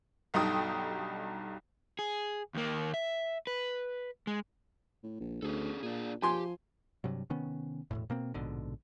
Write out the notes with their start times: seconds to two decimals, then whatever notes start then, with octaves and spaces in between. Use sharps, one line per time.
0.34 B1 G2 D#4 A4 G5 D#6
1.99 G#4
2.54 D#2 A#3
2.94 E5
3.47 B4
4.27 G#3
5.03 A2
5.20 A#1
5.42 D2 C#4 G#4 A4
5.83 A#2 D4 G#4
6.22 F3 G4 G#5 C6
7.04 G2 C3 F#3
7.30 C3 D#3 B3 C#4
7.91 E1 E2 A2
8.10 B2 A#3 C4
8.34 A#1 G#2 B2 D3